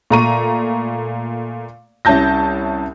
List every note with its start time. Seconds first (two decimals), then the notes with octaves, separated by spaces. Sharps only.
0.11 A#2 A3 A#5 C#6 D#7
2.05 C2 C#4 E4 A5 G6 A#6